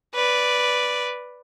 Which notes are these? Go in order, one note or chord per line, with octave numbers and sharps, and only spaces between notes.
B4 D5